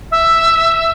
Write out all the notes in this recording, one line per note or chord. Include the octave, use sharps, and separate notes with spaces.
E5